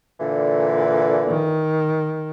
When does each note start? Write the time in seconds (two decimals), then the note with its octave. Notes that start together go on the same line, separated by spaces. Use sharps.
0.20 A#2 D3 E3
1.28 D#3